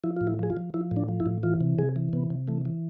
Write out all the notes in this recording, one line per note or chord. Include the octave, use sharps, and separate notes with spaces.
F3 E4
A2 F4
E4
F3 G#4
F4
F3
F3 E4
A2
D4
F3
E4
A2
E3 F4
C3
C3 G#4
E3
C3 B3
C3
E3 A3
E3